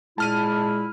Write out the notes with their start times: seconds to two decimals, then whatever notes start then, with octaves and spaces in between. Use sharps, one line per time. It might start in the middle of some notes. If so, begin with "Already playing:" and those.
0.18 A#2 G#3 E4 A5 F6 D#7